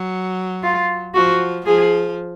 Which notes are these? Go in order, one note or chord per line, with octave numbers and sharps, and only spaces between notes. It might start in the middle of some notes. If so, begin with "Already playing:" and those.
Already playing: F#3
F4
F3 F#4
F3 G#4